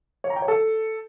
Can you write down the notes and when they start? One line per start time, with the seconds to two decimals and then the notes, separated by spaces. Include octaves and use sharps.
0.24 C#5
0.30 A#5
0.36 G5
0.42 C#5
0.48 A4